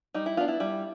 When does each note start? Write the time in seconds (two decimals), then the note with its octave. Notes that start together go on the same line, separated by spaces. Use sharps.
0.14 G3 D#4
0.26 E4
0.37 B3 D4 F4
0.48 E4
0.60 G3